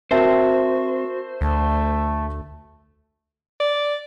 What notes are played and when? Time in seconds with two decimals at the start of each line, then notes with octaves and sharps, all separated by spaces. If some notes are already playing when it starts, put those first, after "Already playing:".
0.11 C4 F#4 A#4 C5 E5 A5
1.41 D2 A3
3.60 D5